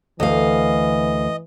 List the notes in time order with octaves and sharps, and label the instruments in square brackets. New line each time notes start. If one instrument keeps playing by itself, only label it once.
[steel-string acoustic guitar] D2 F5 [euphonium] E3 [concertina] D#5